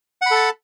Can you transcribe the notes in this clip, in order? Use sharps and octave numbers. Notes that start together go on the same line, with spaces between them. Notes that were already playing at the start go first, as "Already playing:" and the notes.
A4 F#5 A5 B5